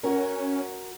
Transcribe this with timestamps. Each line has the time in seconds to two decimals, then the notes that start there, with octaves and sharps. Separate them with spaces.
0.03 C#4 F#4 A#4